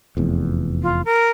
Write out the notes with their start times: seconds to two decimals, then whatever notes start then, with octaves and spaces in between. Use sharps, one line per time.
0.17 F1 E2
0.83 F4
1.05 A#4